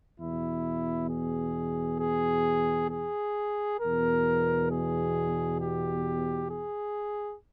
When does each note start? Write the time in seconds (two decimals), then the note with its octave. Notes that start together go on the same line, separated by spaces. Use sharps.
0.19 E2 B2 E4
1.10 G#4
2.00 G#4
2.90 G#4
3.80 E2 B2 A#4
4.70 G#4
5.60 G4
6.50 G#4